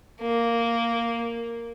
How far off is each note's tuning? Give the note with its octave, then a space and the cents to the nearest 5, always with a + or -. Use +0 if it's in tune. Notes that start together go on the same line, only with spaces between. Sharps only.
A#3 -5